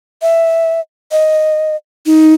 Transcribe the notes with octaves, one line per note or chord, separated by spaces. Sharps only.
E5
D#5
D#4